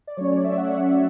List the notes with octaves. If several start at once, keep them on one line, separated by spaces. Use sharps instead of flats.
D5
F#3 A3 C#4 C#5
D5
E5
F#5